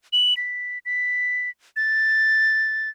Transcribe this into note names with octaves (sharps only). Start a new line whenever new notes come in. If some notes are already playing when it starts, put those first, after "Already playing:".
F#7
B6
B6
A6